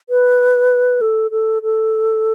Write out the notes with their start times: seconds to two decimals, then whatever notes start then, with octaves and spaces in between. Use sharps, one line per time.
0.09 B4
1.01 A4
1.31 A4
1.63 A4